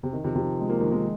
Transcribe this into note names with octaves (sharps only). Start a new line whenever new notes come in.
C3
D#3
C3 F3
C3 F3
G#3
F3 A#3
D#3 G#3
D#3 G#3